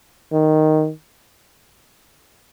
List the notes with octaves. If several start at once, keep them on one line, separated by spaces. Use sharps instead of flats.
D#3